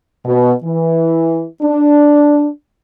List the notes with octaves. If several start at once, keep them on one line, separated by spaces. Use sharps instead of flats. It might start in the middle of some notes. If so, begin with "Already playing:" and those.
B2
E3
D4